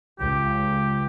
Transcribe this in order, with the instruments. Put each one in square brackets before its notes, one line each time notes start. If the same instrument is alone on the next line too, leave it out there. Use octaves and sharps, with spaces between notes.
[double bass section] C#2 [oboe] G4